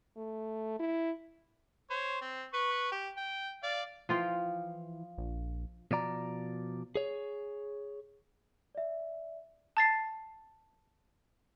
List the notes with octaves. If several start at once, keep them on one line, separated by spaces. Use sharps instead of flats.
A3
E4
C5 C#5
C4
B4 C#6
G4
G5
D5 F5
E3 F3 F4 G5
A#1
B2 F3 D5 A#5
G#4 C#5
D5 E5
A5 A6 C7